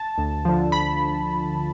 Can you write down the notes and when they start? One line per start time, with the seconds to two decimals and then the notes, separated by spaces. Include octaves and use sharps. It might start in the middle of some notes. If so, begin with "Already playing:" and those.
Already playing: A5
0.18 D2
0.45 D3 F3
0.72 B5